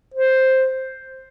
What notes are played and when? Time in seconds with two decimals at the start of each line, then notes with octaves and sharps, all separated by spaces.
0.14 C5